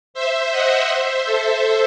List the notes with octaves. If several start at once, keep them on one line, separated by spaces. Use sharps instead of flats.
C5 E5
D#5 F#5
C5 E5
A4 C5